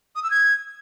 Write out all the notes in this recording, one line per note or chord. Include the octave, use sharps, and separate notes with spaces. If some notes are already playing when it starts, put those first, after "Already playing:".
D#6
E6
G#6